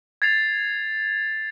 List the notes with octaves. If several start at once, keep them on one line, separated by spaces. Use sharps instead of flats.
G#6 A6 C7 F7